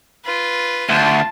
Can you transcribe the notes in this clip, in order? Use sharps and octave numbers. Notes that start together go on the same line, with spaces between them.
F4 B4
D2 F4 A5